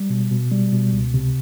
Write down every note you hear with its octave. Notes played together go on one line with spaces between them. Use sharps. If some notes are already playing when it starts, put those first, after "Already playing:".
Already playing: G3
B2
B2
G3
B2
C#2
C3